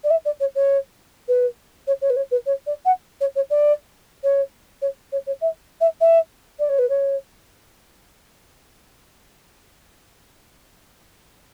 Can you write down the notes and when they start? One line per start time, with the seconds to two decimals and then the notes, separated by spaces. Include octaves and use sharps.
0.04 D5
0.10 E5
0.25 D5
0.40 C#5
0.55 C#5
1.28 B4
1.87 C#5
2.02 C#5
2.10 B4
2.16 C#5
2.31 B4
2.46 C#5
2.67 D5
2.85 F#5
3.21 C#5
3.36 C#5
3.50 D5
4.24 C#5
4.82 C#5
5.12 C#5
5.27 C#5
5.41 E5
5.81 E5
6.01 E5
6.59 D5
6.69 C#5
6.79 B4
6.89 C#5